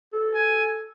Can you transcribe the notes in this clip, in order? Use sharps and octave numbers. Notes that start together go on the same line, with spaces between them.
A4
G#5